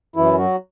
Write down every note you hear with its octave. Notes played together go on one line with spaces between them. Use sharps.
F#2 E3 E4
F#3 F#4